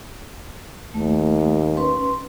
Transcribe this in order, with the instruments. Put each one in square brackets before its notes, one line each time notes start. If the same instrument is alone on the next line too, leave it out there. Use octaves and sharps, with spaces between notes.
[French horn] D#2 [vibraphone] A3
[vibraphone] C#4 B4 C6